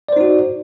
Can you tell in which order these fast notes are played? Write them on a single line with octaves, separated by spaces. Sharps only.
D5 C5 D#4 F#4